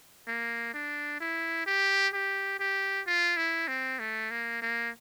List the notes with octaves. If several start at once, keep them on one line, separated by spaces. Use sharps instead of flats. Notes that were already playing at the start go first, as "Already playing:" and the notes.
A#3
D4
E4
G4
G4
G4
F4
E4
C4
A3
A#3
A#3